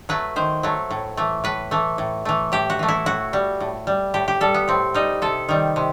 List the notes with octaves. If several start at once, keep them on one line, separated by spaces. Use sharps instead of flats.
F#3 A3 B4
D#3 C5
F#3 A3
A2
E3 A3
A2 B4
E3 A3
A2
E3 A3
A2 G4
F#4
E3 A3
E4
A2 F#4
G3
A2
G3
A2 G4
G4
G3 A4
B3
A2 C4
G3 D#4
C3 A4
D#3 G3
C3